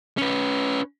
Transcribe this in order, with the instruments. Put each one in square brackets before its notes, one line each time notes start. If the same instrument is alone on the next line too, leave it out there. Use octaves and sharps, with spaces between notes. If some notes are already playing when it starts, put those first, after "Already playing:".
[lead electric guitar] C#4 B4